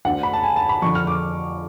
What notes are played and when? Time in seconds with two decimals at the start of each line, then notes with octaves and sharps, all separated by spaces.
0.05 D2 D3 F#5
0.23 B5
0.33 A5
0.43 G#5
0.56 A5
0.69 B5
0.82 F2 D3 C#6
0.95 F6
1.07 D6